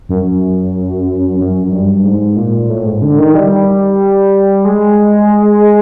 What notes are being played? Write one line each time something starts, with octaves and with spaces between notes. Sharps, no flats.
F#2
F#2
F#2
G2
G#2
A#2
A2
G#2
D3
D#3
G3
G#3